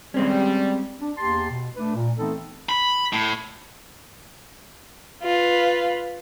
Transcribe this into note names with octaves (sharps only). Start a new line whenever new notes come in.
G3 G#3 C4 C#4
D4
E2 A#3 G4 A5 C6
B2
A3 D4 B4
A#2
E3 A3 B3 C4 D#4 A4
B5
A2
F4 B4